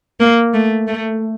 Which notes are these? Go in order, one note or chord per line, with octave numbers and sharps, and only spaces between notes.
A#3
A3
A3